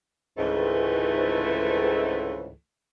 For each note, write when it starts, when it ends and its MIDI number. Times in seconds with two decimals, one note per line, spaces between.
0.38 2.49 37
0.38 2.49 44
0.38 2.55 50
0.38 2.55 52
0.38 2.55 57